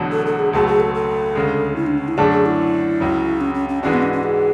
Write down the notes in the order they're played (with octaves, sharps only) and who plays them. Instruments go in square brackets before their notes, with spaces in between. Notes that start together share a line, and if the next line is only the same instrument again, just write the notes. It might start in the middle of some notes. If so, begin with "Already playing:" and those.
Already playing: [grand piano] E1 E2 D3 F#3 A3
[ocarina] A4
A4
G#4
[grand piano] C#2 B2 F#3 A3 [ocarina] G#4
[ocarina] G#4
A4
A4
[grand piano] D2 C#3 G#3
[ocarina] E4
D4
C#4
E4
[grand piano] F#2 D3 A3 D4 [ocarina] G#4
[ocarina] G#4
E4
[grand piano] C#2 C#3 F#3
[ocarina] C#4
C#4
C#4
[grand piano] G#2 E3 G#3 D4 F#4 [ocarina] C#4
[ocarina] B3
C#4
C#4
G#4